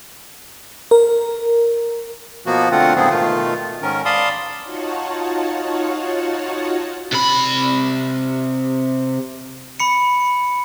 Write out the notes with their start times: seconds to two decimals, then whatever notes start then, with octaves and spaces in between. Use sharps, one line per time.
0.91 A#4
2.46 B2 F3 A#3 B3 F#4
2.72 D3 A3 C4 F4 F#5
2.96 G#2 C#3 F3 B3 C4 G#4
3.10 B2 D#3 A3 F4
3.82 G#2 D#3 C#4 A#4
4.05 D5 F5 A5 B5 C6 D#6
4.63 D#4 F4 F#4 C#5 F#5 A5
7.12 C3 B5
9.80 B5 C#7